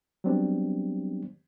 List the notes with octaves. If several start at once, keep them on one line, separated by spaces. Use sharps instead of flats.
F#3 G3 B3 C4 D4 G4